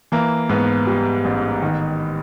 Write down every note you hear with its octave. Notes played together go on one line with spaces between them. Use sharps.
E3 A#3
G#2 B3
G3
A1
D#3